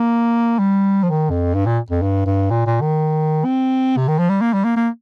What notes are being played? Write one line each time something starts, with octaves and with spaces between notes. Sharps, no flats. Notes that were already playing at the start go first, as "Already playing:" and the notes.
Already playing: A#3
G3
F3
D#3
F2
G2
A#2
F2
G2
G2
A#2
A#2
D#3
C4
C3
D#3
F3
G3
A#3
G3
A#3
A#3